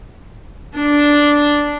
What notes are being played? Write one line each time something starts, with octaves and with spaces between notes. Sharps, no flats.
D4